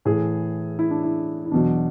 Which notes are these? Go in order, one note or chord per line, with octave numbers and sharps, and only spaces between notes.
A2 E3 G#4
E4
D4
E4
E4
E2 B2 F#3 D4